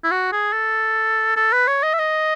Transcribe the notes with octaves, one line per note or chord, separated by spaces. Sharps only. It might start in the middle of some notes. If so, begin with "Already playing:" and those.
E4
F#4
G#4
A4
A4
B4
C#5
D#5
E5
D#5